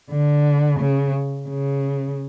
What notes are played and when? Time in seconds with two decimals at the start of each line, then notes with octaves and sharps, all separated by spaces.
0.11 D3
0.80 C#3
1.49 C#3